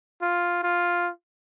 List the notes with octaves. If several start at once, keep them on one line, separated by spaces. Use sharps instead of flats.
F4
F4